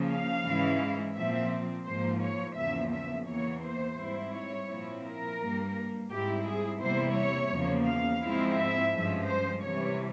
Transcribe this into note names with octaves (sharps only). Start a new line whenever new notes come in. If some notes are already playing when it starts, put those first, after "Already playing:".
Already playing: C#3 F3 A#3
F5
G#2 E3 G#3 C#4 E4
A#2 F3 C4 E5
G#2 F3 A#3 C5
C#5
E2 C#3 F3 A#3 E5
E5
E2 E3 A#3 C#5
C5
G#2 G3 C4 E4
C#5
A#2 F3 C4 E4
A#4
G2 G3 A#3
G#2 G3 C4 E4 G4
G#4
E2 C3 G3 A#3 E4 C5
C#5
E2 C#3 F3 A#3
F5
G#2 F3 G#3 C4 E4
E5
G2 F3 G#3 C#4
C5
C3 E3 G3 C#5